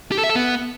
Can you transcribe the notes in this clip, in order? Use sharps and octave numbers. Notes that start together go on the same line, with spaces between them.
G4
A4
E5
A4
B3